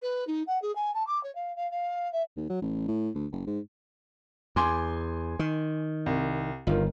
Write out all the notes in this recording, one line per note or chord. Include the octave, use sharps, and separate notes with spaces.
B4
D#4
F#5
G#4
G#5
A5
D6
C#5
F5
F5
F5
E5
D#2
F#3
A1
A2
D2
F#1
G#2
E2 G#5 C6 D6
D#3
C2
G1 D#3 F4